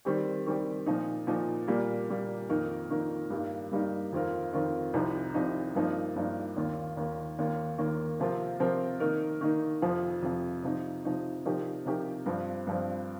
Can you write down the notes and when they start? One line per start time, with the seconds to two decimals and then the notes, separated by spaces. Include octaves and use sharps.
0.05 D#3 G3 C4 G4
0.46 D#3 G3 C4 G4
0.86 A#2 F3 D#4
1.27 A#2 F3 D#4
1.67 A#2 G3 A#3
2.09 A#2 G3 A#3
2.49 F2 D#3 A#3 D#4 A#4
2.90 F2 D#3 A#3 D#4 A#4
3.30 G2 G3 A#3 D#4
3.72 G2 G3 A#3 D#4
4.12 F2 D#3 C4 F4 A#4
4.53 F2 D#3 C4 F4 A#4
4.94 C2 C3 F3 D#4
5.34 C2 C3 F3 D#4
5.75 G2 F3 A#3 D#4
6.16 G2 F3 A#3 D#4
6.56 D#2 D#3 A#3 F4
6.97 D#2 D#3 A#3 F4
7.38 D#2 D#3 A#3 F4
7.78 D#2 D#3 A#3 F4
8.20 C3 F3 C4 F4 A#4
8.59 C3 F3 C4 F4 A#4
9.00 D#3 A#3 D#4 A#4
9.41 D#3 A#3 D#4 A#4
9.82 F2 C3 F3
10.22 F2 C3 F3
10.63 C3 F3 D#4
11.05 C3 F3 D#4
11.45 C3 F3 D#4 G4 A#4
11.85 C3 F3 D#4 G4 A#4
12.26 G2 F3 C4
12.67 G2 F3 C4